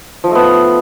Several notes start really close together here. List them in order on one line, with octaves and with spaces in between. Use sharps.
F3 D#4 A3 B3